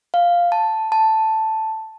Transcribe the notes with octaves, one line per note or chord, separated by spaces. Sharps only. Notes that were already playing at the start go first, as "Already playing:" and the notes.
F5
A5
A5